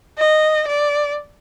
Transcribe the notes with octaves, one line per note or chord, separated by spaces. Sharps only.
D#5
D5